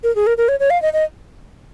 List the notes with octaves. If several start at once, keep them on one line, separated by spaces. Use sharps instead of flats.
A#4
G#4
A#4
A#4
C#5
C#5
F5
D#5
D#5